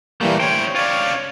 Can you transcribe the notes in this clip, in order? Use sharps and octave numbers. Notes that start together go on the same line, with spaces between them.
A#2 E3 G3 A3 A#3
E3 C5 C#5 G5
C#4 F4 C#5 D5